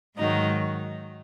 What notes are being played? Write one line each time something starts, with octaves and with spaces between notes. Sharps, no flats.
G#2 D#3 F#3 D#4